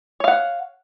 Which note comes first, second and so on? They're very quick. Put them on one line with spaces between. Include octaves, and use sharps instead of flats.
C#5 F5 F#5